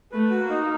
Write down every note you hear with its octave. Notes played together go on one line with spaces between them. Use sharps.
A3 B4
F#4
A#3
D#4